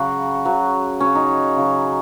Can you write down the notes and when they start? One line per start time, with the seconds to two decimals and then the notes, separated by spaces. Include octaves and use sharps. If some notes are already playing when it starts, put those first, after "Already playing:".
Already playing: C#3 F#3 F#4
0.45 C#3 F#3
1.00 C#3 F#3 C#4
1.15 D#4
1.57 C#3 F#3